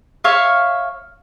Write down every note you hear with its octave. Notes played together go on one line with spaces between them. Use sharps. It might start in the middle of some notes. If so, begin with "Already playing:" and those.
C#5 E5 F5